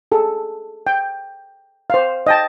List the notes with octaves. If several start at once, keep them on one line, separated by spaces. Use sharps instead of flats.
G#4 A4
G5
C5 F5
D#5 G5 A5